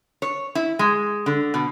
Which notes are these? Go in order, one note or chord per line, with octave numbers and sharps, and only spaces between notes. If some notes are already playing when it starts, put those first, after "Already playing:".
C#5
E4
G#3
D3
B2